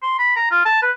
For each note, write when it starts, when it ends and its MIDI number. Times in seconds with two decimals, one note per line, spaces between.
0.03 0.15 84
0.19 0.34 83
0.36 0.46 82
0.51 0.65 65
0.65 0.82 81
0.82 0.90 71